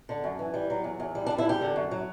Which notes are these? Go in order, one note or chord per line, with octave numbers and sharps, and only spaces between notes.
D3
F#2
E3
G3
F#3
E2
E2
G3
D4
G3
E4
E2 G4
D3
F#2
F#3